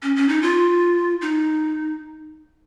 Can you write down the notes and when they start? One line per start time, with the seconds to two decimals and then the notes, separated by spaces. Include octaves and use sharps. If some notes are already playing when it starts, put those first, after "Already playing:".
0.02 C#4
0.16 C#4
0.29 D#4
0.42 F4
1.21 D#4